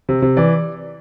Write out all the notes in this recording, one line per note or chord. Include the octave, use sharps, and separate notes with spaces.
C3
C3
E3 D5